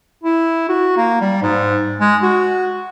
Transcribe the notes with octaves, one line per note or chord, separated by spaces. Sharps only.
E4
F#4
A#3
G3
G#2
G#3
F#4